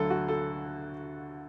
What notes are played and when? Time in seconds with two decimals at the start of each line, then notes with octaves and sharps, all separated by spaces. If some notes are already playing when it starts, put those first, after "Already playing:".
Already playing: D2 D3 F#3 A4
0.10 F#4
0.28 A4